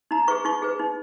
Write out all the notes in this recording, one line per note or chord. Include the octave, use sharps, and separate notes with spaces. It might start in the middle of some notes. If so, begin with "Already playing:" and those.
D#4 A#5
G#4 B4 C#6
D#4 C#6
G#4 B4
D#4